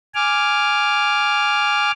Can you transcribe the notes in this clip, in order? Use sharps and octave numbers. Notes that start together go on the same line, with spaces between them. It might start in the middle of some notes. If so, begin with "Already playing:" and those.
G#5 D6 F6